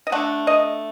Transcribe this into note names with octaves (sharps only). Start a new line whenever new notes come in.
D#5
D3 A3 D4 F#5
D#5